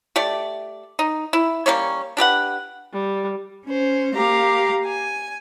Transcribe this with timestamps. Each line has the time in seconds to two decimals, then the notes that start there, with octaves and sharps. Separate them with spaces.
0.16 A3 G4 D5
0.99 D#4
1.33 E4
1.66 G3 A#3 C#4 C#5
2.17 D4 G4 B4 F#5
2.93 G3
3.66 C#4 C5
4.14 A#3 G4 F5 A#5
4.86 G#5